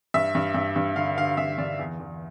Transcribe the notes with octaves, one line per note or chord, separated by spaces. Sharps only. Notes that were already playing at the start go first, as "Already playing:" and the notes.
G2 E5
G2
G2
G2
D3 F5
D3 F5
G2 E5
G2 D5
E2
E2